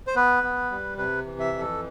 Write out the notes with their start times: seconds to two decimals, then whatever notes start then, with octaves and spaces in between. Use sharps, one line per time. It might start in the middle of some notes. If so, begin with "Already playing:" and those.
0.07 C5
0.16 B3 B4
0.43 B3
0.71 G3
0.97 C3 B4
1.25 E3
1.39 E5
1.53 F2
1.59 A4